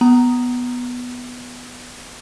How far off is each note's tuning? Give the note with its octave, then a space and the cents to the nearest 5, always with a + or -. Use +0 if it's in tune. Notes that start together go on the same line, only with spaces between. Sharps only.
B3 +0 A#5 +0